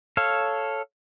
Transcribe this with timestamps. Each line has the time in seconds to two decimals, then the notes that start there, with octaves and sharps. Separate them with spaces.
0.17 A4 C#5 F5